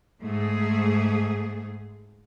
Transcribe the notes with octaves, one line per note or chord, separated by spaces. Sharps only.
G#2 A3 G#4